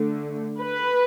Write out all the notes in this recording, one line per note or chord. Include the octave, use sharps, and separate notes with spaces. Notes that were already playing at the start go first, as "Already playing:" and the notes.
Already playing: D3 A3
B4